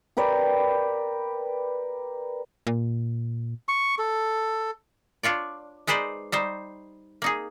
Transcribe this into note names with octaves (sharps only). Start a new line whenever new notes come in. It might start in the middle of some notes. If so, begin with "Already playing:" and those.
G4 A#4 B4 D5
A#2
C#6
A4
D4 F4 C#5 D5
G#3 D#4 B4 C5 D5
G3 D#4 C5
A#3 D#4 G#4